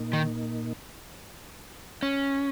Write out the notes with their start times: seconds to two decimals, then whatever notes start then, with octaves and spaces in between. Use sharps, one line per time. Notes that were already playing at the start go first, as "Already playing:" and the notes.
Already playing: A#2 A#3 D#4
0.13 D#3
2.03 C#4